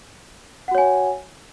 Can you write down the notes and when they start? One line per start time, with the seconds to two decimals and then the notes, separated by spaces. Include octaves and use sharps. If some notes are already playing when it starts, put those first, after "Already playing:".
0.68 F#5
0.71 F#4
0.75 C#5
0.78 G#5